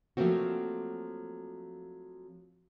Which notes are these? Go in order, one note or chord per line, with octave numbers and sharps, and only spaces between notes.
F3 F#3 A3 A#3 C4 F#4